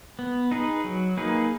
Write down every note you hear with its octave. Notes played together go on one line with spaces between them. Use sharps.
B3
D#4 G#4 B4
F#3
A#3 D#4 G#4 B4